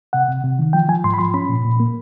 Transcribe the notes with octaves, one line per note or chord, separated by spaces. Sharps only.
C3 F#5
C3
C3
D#3
F3 G5
F3 G#5
G#2 C6
B5
F3 C6
C#4 B5
A#2
A#2
A#3